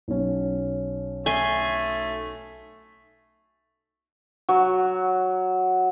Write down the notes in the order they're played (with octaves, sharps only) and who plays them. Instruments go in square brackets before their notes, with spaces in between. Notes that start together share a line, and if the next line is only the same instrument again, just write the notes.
[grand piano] B1 C#4
[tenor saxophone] A3 [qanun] G#5 C6
[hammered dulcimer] F#3